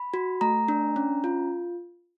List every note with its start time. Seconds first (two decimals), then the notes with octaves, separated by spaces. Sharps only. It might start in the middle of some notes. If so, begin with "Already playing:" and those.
Already playing: B5
0.14 F#4
0.41 A3 A#5
0.68 D4
0.96 C#4
1.24 F4